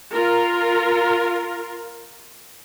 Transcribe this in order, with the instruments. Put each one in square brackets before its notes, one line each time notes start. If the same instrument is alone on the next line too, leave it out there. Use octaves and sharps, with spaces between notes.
[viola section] F4 A#4